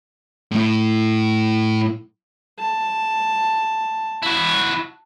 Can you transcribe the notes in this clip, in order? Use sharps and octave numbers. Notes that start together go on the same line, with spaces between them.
A2 E4
A5
E4 F#4